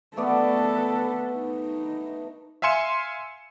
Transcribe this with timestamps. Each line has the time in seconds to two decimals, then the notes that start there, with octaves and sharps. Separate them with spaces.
0.17 A3 B3 A4 B4 D5
1.33 D#4
2.62 E5 F5 G#5 C6 C#7 E7